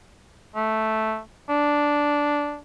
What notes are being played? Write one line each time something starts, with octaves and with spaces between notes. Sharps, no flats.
A3
D4